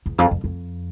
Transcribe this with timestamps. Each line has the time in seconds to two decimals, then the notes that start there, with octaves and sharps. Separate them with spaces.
0.06 E2
0.18 F2
0.31 F2
0.44 F2